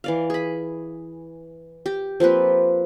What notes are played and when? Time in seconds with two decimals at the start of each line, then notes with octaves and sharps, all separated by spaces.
0.04 E3 D5 F5
0.30 G#4 B5
1.86 G4
2.20 F3 A#3 C4 B4